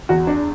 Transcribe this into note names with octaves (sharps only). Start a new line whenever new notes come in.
E2 F#4
D4